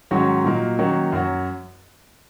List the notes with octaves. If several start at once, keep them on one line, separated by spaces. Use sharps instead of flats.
G#2 D#3 F#3 C#4 F#4
A#2 F#3 A#3 D#4
D#3 F#3 A#3 C#4
F#2 F#3 C#4 F#4